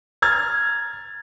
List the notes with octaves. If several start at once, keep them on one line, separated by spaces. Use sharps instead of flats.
A#5 F6 G#6 A6